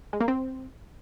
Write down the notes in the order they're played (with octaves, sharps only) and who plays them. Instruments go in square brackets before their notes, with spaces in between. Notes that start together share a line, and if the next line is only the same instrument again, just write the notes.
[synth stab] G#3
A#3
C4